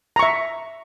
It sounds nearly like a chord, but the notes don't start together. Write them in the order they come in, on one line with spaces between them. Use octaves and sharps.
A#5 C#6 E5